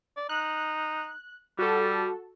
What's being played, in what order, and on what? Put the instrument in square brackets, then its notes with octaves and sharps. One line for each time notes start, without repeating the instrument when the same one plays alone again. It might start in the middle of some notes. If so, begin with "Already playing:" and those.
[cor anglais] D5
[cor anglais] D#4 [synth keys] F#6
[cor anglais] G3 [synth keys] F#4 A4